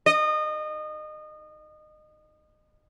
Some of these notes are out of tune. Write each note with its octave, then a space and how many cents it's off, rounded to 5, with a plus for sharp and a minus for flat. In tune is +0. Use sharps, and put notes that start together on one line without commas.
D#5 -25